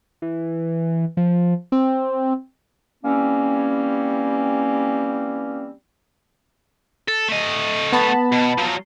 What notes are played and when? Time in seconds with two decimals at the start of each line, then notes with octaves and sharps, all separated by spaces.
0.22 E3
1.17 F3
1.72 C4
3.04 E3 G3 A#3 C4 C#4
7.08 A4
7.29 A3 D#5
7.92 B3 A5 B5
8.32 B2
8.58 F3 F#3